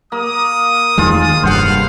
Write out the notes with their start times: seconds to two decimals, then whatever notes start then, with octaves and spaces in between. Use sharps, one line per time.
0.12 A#3 D#6
0.98 E2 D#3 G#3 F4 G#4
1.43 F1 G2 C5 F5 F#5